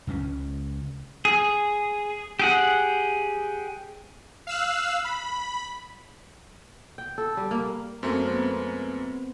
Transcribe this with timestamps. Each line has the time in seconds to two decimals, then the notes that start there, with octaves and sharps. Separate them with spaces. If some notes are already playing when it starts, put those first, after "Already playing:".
0.07 C#2 C#3 F#3 C#4
1.25 G#4
2.39 G4 G#4 F#5
4.47 F5 E6 F#6
5.05 B5
6.98 G5
7.18 A4
7.37 G3
7.51 A#3
8.03 F#2 A3 A#3 C4
8.27 B3 C4